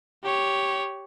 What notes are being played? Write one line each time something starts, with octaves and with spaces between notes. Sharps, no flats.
G4 C#5